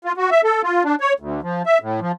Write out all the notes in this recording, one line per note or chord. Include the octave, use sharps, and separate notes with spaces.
F4
F#4
E5
A4
F4
D4
C#5
D2
F3
E5
A2
F3